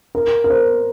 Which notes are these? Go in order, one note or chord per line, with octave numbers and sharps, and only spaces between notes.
A#4
A#4
C5